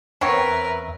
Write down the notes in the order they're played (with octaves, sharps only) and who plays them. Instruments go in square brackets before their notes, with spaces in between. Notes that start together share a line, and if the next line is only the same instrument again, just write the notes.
[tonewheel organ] E2 E5 [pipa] B3 C4 C#5 [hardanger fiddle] A#4 B4